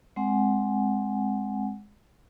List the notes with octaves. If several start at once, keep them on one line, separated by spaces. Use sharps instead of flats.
G#3 C4 F#5 G#5